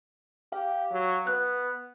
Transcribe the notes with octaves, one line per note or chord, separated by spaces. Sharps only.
G4 F5
F#3
B3 F#6